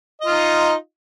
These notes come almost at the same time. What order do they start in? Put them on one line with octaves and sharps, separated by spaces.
D#5 F4 D#4